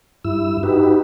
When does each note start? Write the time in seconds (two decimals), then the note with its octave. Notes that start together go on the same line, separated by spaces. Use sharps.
0.25 G2 E4 E6
0.63 D#4 F#4 G4 B4